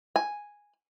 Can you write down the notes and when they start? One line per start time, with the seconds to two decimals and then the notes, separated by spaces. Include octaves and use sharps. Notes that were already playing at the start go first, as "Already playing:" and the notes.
0.16 G#5